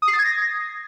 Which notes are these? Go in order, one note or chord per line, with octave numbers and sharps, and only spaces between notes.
D#6
C7
A6
G#6
A#6